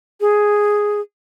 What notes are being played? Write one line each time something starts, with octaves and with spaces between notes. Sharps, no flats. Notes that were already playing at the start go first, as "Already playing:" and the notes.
G#4